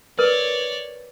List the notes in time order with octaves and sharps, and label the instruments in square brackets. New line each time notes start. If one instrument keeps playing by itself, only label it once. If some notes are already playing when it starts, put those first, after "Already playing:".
[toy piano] A#4 B4 [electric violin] C#5 D5